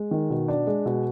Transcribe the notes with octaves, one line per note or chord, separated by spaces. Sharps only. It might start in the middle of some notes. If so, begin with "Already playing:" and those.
Already playing: G#3
D#3
B2
D4
G#3
B2